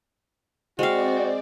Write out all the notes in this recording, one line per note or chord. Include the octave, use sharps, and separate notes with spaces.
G#3 C4 F#4 C5 D5 F5 G5